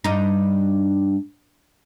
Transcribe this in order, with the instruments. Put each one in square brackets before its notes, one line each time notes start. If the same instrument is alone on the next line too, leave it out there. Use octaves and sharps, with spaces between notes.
[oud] G2 D#4